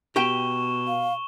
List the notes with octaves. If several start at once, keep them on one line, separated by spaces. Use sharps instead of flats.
B2 G4 G5 C#6 E7 G7
F5